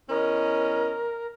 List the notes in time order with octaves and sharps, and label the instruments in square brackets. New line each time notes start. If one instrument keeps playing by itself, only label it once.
[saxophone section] E2 C#4 D#5 [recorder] A#4